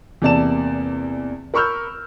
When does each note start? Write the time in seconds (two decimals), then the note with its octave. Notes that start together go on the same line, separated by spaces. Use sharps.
0.22 E2 C3 A#3 D5 A5 E7
1.54 A#4 B5 C#6 E6 F6 G6